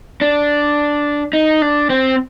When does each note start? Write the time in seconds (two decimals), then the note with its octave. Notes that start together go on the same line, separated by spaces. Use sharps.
0.21 D4
1.33 D#4
1.62 D4
1.90 C4